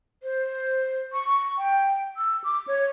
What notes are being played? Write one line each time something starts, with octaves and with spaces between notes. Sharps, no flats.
C5
C#6
G5
E6
D6
C#5